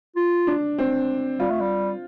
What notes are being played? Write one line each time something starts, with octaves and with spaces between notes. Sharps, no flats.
F4
D4
C4
G3 F4
A3
G3